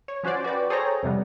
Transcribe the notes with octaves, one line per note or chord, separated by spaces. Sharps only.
C#5
F3 C#4 F#4 C5 D5
F#4 B4 D5 G5
G#4 A4 C5 C#5 G5 A#5
F2 C3 G3 B3